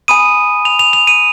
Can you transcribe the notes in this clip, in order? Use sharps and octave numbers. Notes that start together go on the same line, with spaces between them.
G#5 B5 D#6 D#7
F7
F7
F7
D#7